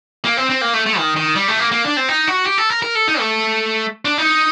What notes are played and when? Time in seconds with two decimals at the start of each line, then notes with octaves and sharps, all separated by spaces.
0.25 A#3
0.37 C4
0.50 C4
0.61 A#3
0.74 A3
0.86 A3
0.98 D#3
1.16 D#3
1.35 G3
1.48 A3
1.59 A#3
1.72 A#3
1.85 D4
1.97 C4
2.09 D#4
2.28 F#4
2.46 G4
2.58 A4
2.70 A#4
2.82 A#4
2.95 A4
3.08 D#4
3.19 A3
4.05 D4
4.18 D#4